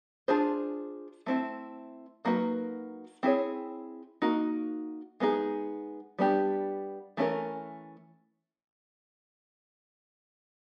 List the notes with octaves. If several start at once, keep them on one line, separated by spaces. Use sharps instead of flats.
D4 F4 G#4 C5
A3 C4 E4
F#3 A#3 D#4 F#4 B4
C4 E4 G#4 C#5
A#3 D#4 F#4
G#3 B3 D#4 G#4
G3 B3 D4 G4
E3 A3 C#4 F4 A#4